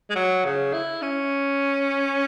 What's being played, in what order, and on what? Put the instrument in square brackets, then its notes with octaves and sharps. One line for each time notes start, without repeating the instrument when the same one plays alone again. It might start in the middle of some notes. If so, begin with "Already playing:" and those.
[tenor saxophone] G#3
F#3
C#3
E4
C#4